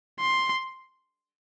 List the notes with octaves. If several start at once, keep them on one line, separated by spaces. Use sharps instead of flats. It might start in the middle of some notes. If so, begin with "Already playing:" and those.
C6